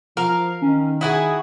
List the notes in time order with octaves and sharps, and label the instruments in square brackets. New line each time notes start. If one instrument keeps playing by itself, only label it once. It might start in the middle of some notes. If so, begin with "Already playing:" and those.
[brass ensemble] F3 [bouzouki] A#4 F5
[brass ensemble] D#3 [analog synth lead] C#4
[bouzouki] E4 F#4 G#4 [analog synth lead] D#6